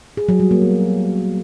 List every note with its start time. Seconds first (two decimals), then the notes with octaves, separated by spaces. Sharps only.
0.17 G#4
0.29 F#3
0.40 G3
0.51 A#3
0.62 B3